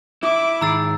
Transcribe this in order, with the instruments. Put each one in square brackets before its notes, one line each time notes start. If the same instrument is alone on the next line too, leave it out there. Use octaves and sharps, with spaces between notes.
[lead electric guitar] E4 [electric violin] D6
[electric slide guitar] G#2 D#3 G#4 [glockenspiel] A#5 E6 A6